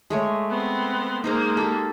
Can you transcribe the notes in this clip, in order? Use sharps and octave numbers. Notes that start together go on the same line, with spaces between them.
G#3 A3 C#5
B3 C4
G#3 A#3 D#4 C5 A#5
G4 A4